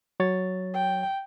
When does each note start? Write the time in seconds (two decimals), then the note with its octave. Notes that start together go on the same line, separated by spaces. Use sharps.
0.20 F#3 C#5 A6
0.74 G5